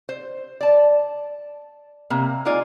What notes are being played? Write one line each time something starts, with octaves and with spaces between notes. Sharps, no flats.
C5
D5 A5
C3 A#3
G#3 D#4 F4 D5 G#5